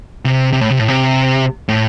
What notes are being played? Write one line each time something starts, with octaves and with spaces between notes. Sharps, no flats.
C3
C3
A2
C3
A2
C3
A2